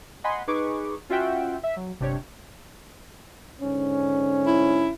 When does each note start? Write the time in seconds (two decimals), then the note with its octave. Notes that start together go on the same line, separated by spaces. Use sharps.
0.24 D#5 F#5 G#5 B5 C6
0.47 D#4 G#4 B4 C#6 D6
1.09 C#4 F4 F#4 E5 F#5 G5
1.63 E5
1.77 F#3
1.99 G1 C3 D4 G4 C#5
3.61 G#2 D3 C#4
4.46 E4